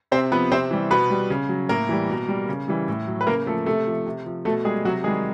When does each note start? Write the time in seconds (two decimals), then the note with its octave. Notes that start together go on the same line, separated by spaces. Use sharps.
0.12 C3 C4 C5
0.32 F3 B3 B4
0.52 C3 C4 C5
0.71 E3 G3
0.90 B2 B3 B4
1.10 G3
1.30 C#3
1.49 F#3
1.69 A2 A#3 A#4
1.89 E3 G3
2.09 B2
2.28 G3
2.49 C#3
2.68 E3 G3
2.88 A2
3.07 F#3
3.21 B4
3.27 C#3 A#3 A#4
3.47 F3 A3 A4
3.66 C3 A3 A4
3.87 F3
4.06 C3
4.26 F3
4.45 B2 A3 A4
4.65 G3 G#3 G#4
4.85 C3 F#3 F#4
5.04 D#3 G#3 G#4
5.07 G3